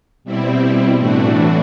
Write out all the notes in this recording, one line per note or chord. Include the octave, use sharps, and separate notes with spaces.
B2 G3 C4 E4
A2 E3 A3 D4 F#4